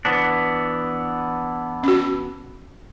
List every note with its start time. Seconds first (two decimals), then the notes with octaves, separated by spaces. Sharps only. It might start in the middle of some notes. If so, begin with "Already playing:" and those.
0.05 E3 B3 D4
1.83 C#4 F#4